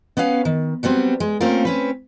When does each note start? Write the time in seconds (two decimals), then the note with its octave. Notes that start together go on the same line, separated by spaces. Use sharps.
0.17 B3 C#4 B4 F5
0.45 D#3
0.83 F#3 G3 B3 C4
1.20 G#3
1.41 A3 A#3 C4 C#4 F4 A#4
1.65 C4 C#4 B4